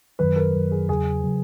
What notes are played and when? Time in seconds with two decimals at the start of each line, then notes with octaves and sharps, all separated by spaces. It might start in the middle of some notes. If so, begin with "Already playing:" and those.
0.19 F#2 D#3 F#3 B4
0.36 A#4
0.53 F#2 D#3 F#3
0.71 G#4
0.89 E2 C#3 F#3 G#4
1.24 C#3 F#3